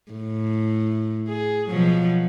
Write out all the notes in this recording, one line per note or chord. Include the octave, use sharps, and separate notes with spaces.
A2
G#4
B2 F3 F#3